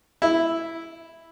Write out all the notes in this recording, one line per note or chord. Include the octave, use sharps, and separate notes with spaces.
E4